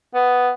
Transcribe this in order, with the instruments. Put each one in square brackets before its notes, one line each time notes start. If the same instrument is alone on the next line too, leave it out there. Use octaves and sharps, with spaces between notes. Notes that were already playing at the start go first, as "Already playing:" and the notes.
[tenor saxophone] B3